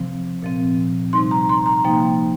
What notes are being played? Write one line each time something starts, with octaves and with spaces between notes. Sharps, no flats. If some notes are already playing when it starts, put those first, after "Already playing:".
Already playing: C3 F3 C4
A#2 F3 C4
C3 G3 D#4 C6
A#5
C6
A#5
C3 F3 A#3 D#4 G5